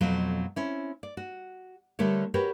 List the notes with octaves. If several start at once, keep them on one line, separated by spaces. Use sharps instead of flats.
F2 B2 F#3 A3 C4 F4
C4 C#4 E4
D5
F#4
D3 G3 A3 A#4 C#5
F#4 G4 A#4 B4 C#5